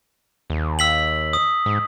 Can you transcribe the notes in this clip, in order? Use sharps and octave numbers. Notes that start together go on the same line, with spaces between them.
D#2
E6 B6 F#7
D#6
G#2